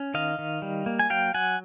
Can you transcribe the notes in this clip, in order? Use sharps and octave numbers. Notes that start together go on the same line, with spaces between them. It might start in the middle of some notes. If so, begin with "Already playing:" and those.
Already playing: C#4
D#3 D#5 F5
D#3
G3
A#3
G#5
F#3 F5 G5
F#3 F#5 G#5